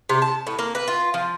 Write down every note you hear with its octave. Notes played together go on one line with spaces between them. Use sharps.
C3
A5
A2
A#3
B4
F4
F3